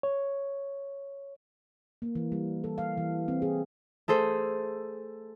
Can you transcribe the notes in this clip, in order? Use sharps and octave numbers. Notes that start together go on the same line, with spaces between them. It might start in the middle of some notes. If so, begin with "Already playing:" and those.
C#5
A#3
E3
G3
A4
F5
E3
C4
G#4
A3 G#4 A4 C5